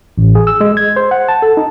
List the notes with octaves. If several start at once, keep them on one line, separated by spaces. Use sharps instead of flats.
A1
G#4
E6
G#3
G#6
C5
F#5
A5
A4
D#4